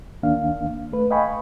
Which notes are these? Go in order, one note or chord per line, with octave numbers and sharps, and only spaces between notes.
D2 D#3 A#3 D4 F5
A3 B4
D#5 F5 G5 G#5 B5 C#6